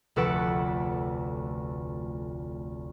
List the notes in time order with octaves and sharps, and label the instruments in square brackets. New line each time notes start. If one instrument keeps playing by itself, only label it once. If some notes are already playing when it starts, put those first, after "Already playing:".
[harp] F1 D2 A4 B4 F#5 D7